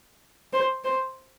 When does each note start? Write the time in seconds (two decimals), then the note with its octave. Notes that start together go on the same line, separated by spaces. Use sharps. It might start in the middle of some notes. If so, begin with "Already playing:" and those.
0.53 C5
0.84 C5